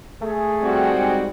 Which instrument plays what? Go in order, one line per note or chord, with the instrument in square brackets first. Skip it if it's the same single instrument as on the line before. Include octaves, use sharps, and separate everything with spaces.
[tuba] A3 [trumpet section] G#4
[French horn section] G3 C4 F#4
[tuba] G#2